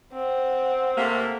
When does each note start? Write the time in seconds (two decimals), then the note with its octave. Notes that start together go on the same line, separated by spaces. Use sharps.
0.13 C4 F#5
0.97 C3 A3 A#3